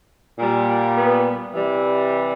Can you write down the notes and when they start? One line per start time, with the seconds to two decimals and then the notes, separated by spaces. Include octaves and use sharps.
0.38 A#2 G3
0.95 B3
1.53 C3 E3 G3